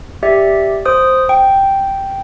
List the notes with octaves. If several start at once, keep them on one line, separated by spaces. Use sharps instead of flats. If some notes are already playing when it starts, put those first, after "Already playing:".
G4 D5 E5
C5 D#6
G5